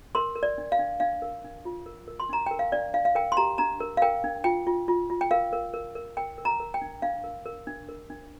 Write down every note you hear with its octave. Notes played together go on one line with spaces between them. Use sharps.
A#4 C6
A#4
D5
D4
F5
D4
D4 F5
A#4
D4
F4
A#4
A#4
C6
D4 A#5
A#4 G5
F5
D4 D5
D4 F5
F5
A#4 G5
C6
G4 A#5
D4 A#5
A#4
F5
A#4 G5
D4
F4 G5
F4
F4
F4
G5
A#4 F5
A#4
A#4
A#4
A#4 G5
A#4
A#5
A#4
G5
D4
D4 F5
A#4
A#4
D4
A#4
D4